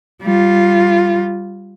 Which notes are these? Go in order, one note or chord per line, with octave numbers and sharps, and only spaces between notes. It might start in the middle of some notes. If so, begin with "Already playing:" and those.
G3 F4